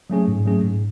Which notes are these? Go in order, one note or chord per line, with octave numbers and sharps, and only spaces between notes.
F#3 A3 C#4 G#4
G#2
F#3 A3 C#4 G#4
G#2